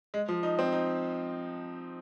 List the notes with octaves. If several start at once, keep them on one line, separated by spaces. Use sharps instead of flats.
G#3
F3
D#4
C4
D#4